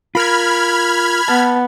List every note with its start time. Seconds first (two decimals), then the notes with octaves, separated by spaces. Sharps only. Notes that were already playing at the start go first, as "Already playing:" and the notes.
0.15 F4 A#4 B5 F6 G#6
1.28 B3 A5